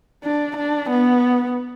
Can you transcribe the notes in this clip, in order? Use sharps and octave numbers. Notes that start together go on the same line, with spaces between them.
D4
D4
B3